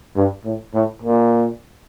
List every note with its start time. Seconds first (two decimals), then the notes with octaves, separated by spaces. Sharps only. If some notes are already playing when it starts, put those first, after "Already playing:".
0.16 G2
0.44 A2
0.73 A2
1.02 A#2